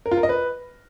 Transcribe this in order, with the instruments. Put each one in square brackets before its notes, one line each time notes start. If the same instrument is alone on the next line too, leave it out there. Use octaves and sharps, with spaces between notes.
[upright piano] A#4
F4
A#4
D#5
B4